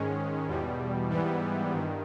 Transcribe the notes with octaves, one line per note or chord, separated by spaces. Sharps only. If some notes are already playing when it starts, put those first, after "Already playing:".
Already playing: G#2 D#3 G#3 C#4
E2 B2 G3
G#2 E3 G3 B3
G2 D#3